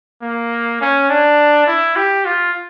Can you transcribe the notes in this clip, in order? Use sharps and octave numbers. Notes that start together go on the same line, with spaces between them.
A#3
C#4
D4
E4
G4
F4